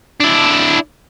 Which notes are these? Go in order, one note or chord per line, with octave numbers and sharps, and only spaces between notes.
D4 E4